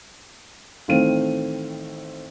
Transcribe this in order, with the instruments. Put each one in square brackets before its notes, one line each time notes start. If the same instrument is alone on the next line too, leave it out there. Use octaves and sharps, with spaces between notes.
[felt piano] A1 D#3 A3 C4 F5 D#7